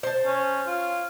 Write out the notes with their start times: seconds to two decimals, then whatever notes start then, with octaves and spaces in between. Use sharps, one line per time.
0.03 C5 A5
0.26 C#4
0.67 F4